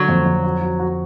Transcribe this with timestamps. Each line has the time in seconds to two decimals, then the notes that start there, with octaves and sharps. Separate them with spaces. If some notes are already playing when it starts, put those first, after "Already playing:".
Already playing: D3 F#3
0.08 F2
0.26 F2
0.44 F#4
0.61 F#4
0.80 F#4